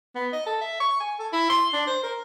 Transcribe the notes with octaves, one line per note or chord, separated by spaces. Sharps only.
B3
D#5
A4
E5
C#6
G#5
A4
E4
C6
D4
C5
A#4